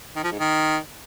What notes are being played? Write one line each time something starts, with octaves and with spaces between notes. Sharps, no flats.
D#3
F3
G#2
D#3